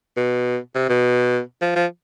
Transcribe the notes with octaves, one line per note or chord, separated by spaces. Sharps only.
B2
C3
B2
F3
F3